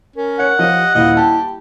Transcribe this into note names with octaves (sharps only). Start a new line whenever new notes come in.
C#4 A#4
C#5 F#5
F3 G4 D#5
D#1 E4 D#5 F5
G4 A5